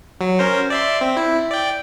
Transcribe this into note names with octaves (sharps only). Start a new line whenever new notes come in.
F#3
C#4 A#4 C5
D5 E5 C6
C4
E4
D5 G5